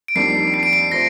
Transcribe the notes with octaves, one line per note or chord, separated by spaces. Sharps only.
D7
F2 D#3 G3 A#3 D4 C7
C7
D7
C7
F3 A3 C4 A#6